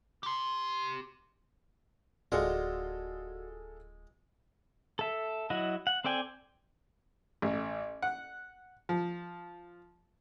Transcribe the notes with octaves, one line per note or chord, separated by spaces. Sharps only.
G4 C6
D1 G#3 F4 F#4 G#4 A4 D5 F5
A4 E5
F#3 E4 F#4 D#5
F#5
C4 A4 D5 G5 G#5
A1
F#5
F3